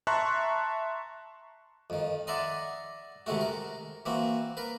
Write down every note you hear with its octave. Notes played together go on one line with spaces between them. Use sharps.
E5 A5 A#5 C6 C#6 F#6
F2 D#3
D5 E5 F#5 A#5 C6 D#6
C3 D#3 G#3 A3 F#4
A#4
E3 A#3 C4 F#4
A#4 B4